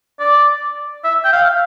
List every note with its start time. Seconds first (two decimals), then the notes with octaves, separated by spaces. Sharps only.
0.20 D5
1.04 E5
1.25 G5
1.33 F5